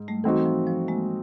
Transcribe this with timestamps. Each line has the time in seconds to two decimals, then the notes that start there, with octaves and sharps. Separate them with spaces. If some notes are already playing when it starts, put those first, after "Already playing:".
Already playing: G#2
0.08 G3 A3
0.24 E3 A3 C4 D#4 F#4
0.46 F3
0.67 F3
0.88 G#3 A#3